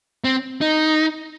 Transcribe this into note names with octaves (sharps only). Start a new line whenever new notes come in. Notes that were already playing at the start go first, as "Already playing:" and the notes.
C4
D#4